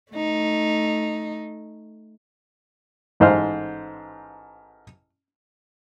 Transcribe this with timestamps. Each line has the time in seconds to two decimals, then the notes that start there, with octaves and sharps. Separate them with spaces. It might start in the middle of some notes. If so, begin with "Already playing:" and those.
0.12 A3 D#4
3.20 A1 G#2 C5 F5 F6